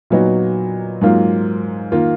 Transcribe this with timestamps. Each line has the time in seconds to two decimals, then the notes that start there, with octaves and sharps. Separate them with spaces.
0.10 A#2 F#3 B3 D#4 F#4
1.01 G#2 F#3 A#3 F4
1.92 D#3 A#3 F4